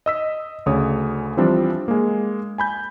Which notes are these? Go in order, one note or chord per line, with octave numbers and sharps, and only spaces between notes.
D#5 E6 B6
D2 C#3 C#5 D#6
E3 F3 G3 C4 D4
G#3 A#3
G#5 B5 G6